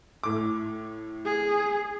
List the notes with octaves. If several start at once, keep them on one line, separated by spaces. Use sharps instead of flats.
A2 D6
G#4